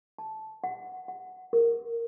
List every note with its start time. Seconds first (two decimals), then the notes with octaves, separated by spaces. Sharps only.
0.19 A5
0.64 F#5
1.08 F#5
1.53 A#4